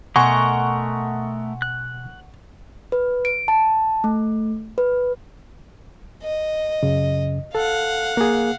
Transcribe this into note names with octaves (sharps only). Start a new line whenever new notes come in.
B2 A3 A#4 D#5 F#5 G#5 C6 C#6
F#6
B4
D7
A5
A3
B4
D#5
F#2 C#3
A4 F5 F#5
A#3 G#4